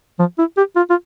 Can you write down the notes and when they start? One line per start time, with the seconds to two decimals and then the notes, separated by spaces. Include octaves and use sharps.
0.19 F3
0.38 E4
0.57 G4
0.76 F4
0.90 F4